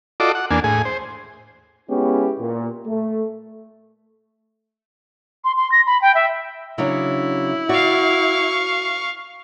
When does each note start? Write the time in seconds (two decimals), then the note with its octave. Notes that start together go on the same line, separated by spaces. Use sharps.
0.20 F4 F#4 A4 D5 D#5 D6
0.35 F#5
0.51 E2 A#3 D4 G#5
0.64 A2 G#4 G#5
0.85 C5
1.89 G#3 B3 C#4 E4 G4
2.39 A#2
2.86 A3
5.44 C6
5.57 C6
5.72 A#6
5.87 B5
6.02 G5
6.15 E5
6.78 C#3 F#3 D4 E4
7.69 F#4 D5 F5 C#6